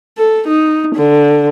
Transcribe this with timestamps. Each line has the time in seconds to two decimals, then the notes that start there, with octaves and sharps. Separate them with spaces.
0.18 A4
0.47 D#4
0.95 D3